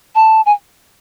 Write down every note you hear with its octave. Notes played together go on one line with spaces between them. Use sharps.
A5
G#5